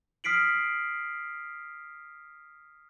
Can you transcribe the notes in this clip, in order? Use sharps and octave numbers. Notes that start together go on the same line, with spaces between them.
D#6 F6 B6 C7 D7 F#7